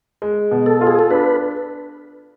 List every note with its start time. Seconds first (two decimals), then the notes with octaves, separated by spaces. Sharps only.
0.22 G#3
0.51 B2
0.66 A4
0.81 F4
0.87 G#4
0.99 A4
1.11 D4 B4